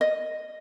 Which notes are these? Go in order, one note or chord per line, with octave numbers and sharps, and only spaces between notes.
D#5